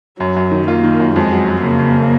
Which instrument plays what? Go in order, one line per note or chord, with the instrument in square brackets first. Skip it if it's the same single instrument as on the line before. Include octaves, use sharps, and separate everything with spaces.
[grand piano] F#2 [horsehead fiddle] F#3
[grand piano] F#2
D#3
[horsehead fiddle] A#3 [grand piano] F4
[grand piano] D#3
F#2
[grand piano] F2 [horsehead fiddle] G#3
[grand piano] F#3
F#3
[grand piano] C#3 [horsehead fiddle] A#3
[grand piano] C#3